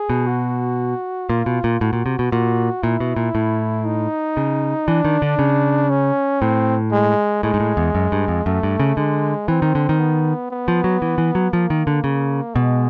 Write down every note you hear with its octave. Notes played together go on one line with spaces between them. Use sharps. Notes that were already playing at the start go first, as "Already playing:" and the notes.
Already playing: G#4
B2
F#4
A#2 F4
B2
A#2
A2 F#4
A#2
C3
B2
A#2 F#4
A#2 E4
B2
A#2
A2
D#4
C#3
E3 D4
D#3
D3
C#3
C#4
A2 C4
G#3
A2 G#3
G#2
A2
E2
F#2
G2
F2
F#2 A3
G2
C#3
D3 G#3
E3 C4
D#3
D3
D#3
B3
B3
F3
F#3
E3
E3
F#3
F3 A#3
D#3
D3
C#3
B2 G#3